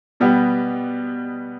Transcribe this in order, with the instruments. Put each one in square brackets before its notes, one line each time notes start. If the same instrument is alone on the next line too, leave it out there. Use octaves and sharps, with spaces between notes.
[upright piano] B2 G3 B3 G4